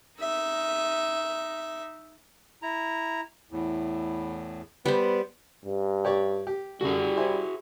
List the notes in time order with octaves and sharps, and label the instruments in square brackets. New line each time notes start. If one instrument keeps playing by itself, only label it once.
[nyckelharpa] D#4 E5
[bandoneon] E4 A#5
E2 A2
[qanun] G3 C5 [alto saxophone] B3
[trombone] G2
[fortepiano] G4 C#5 D5
G4
[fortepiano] F#2 D3 [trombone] G3 [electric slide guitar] F#4 G#4
[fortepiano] E4 C5 G#5